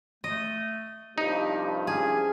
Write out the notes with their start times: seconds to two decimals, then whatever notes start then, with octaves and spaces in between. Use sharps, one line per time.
0.24 A3 D#5
1.18 C2 G2 F3 D#4 G4
1.87 C#4 G#4